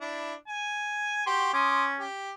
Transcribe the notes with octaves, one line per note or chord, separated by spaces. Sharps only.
D4 E4
G#5
F#4 G4 C6
C#4 C6 D6 D#6
G4